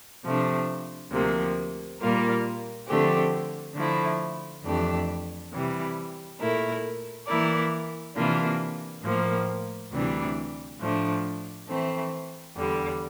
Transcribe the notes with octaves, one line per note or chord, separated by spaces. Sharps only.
C3 F3 A3 D4
D2 C3 F3 A#3
A#2 G3 A#3 F4 A#4
D3 F3 A3 C4 G4
D3 F3 A3 E4
F2 E3 A3 D4 G4
C3 E3 G3
A#2 A3 E4 A#4
E3 A#3 E4 A#4 D5
C3 E3 A#3 D4 F4
A2 F3 A#3
D2 C3 E3 G3 D4
A2 F3 A3 D4
E3 A3 C4
E2 D3 G3